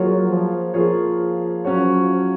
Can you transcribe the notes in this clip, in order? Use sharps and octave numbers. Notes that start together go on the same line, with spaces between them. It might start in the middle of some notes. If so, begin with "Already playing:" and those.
Already playing: F#3 A#3 F4 G#4 C#5
F3
F3 A#3 F4 G#4 C#5
F#3 C#4 F#4 C#5